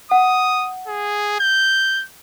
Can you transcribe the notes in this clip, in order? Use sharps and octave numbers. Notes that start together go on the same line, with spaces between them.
F#5 D#6
G#4
G6